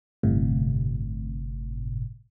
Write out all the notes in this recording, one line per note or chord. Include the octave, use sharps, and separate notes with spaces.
G1 A2 C3